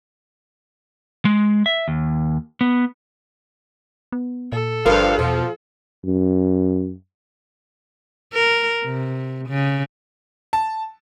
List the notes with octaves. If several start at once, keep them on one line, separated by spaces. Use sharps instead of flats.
G#3
E5
D#2
B3
B3
A#2 A4
G1 G2 F3 A#4 F5
E2 B2 F3
F#2
A#4
C3
C#3
A5